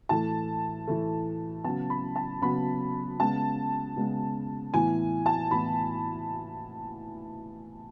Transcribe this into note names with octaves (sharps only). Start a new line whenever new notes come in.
A2 E3 A3 A5
A2 E3 A3
C#3 F#3 B3 A5
B5
A5
C#3 F#3 B3 B5
C#3 G#3 B3 A5
C#3 G#3 B3
A2 E3 B3 G#5
A5
A2 E3 B3 B5